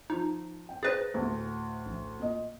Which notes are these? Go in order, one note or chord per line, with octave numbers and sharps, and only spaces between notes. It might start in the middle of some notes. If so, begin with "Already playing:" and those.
F3 D#4
G5
G#4 B4 C5 A6 A#6
D2 A2
A#1
A#2 D#5